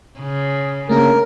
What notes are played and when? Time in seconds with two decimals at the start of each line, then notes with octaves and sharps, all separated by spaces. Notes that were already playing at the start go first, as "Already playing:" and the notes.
0.20 C#3
0.89 C#3 A3 A#3 D4 A#4